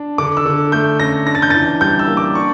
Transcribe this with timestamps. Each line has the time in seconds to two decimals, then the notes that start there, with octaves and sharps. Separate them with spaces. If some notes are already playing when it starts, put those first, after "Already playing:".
Already playing: D4
0.18 D3 D6
0.37 E6
0.46 D3
0.72 A3 G6
1.00 C#4 A#6
1.27 D4 A#6
1.35 A6
1.42 G6
1.50 E3 A6
1.81 G3 G6
1.99 E6
2.08 A#3
2.17 D6
2.35 D4 C#6